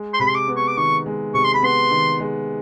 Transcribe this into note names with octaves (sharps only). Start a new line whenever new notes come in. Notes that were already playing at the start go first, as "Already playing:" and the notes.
Already playing: G#3
C6
C3 B5
C6
D6
B3
C#6
D6
D#3 C#6
G#3
C3 C#6
C6
B5
B3 C6
D#3
G#3